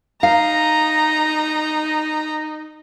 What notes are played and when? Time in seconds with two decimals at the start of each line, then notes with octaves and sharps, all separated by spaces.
0.23 D#4 F5 A#5